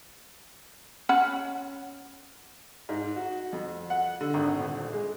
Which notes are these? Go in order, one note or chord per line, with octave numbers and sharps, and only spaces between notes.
C#4 F#5 B5
G#2
F#4
F2
F#5
D3
G#1
D#1
G#3